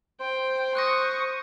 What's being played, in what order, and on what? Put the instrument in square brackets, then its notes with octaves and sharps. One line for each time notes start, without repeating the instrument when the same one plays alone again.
[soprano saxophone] C5 [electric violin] G5
[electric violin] C#6 D#6 [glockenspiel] F#6 G6 A#6